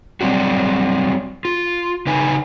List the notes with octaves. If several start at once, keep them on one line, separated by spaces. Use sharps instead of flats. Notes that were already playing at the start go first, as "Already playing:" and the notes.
F#3 G3 C4 D4 F#4
F4
C#3 D#4 B4 G#5